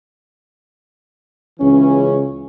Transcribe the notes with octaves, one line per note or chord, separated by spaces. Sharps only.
C#2 C#3 E3 C#4